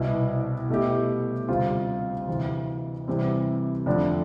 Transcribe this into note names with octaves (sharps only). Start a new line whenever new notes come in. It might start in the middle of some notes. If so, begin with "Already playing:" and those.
Already playing: C2 B2 B3 E4
B2 A3 E4 G4
D2 C3 G3 C4 F4
D2 C3 E3
C3 E3 G3 C4
F2 D3 A3 D4